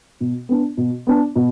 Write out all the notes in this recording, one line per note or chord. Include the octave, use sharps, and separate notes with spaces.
B2
B3 D4
B2
B3 D4
B2